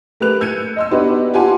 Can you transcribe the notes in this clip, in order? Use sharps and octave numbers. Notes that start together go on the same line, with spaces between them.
A3 G4 A#4 B4 F#6 F7
E6 G6 G#6 C#7 D#7
D#5 C6 E6
B3 D4 D#4 F#4 G4 B4
F4 G4 F#5 G#5 A5 C6